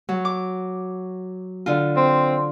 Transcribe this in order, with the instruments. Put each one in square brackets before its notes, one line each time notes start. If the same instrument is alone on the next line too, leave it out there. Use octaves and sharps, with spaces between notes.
[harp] F#3
D6
D3 F4
[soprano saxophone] C4